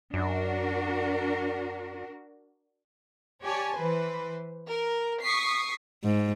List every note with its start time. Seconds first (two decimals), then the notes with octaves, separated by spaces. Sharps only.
0.14 F#2 D4 F#4 A#4
3.43 G4 C#5 D5 G#5 A5
3.75 E3 B4 C5
4.70 A#4
5.23 C#6 D#6 B6 C7
6.04 G#2